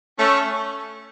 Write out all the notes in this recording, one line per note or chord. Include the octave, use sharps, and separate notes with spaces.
A3 C#4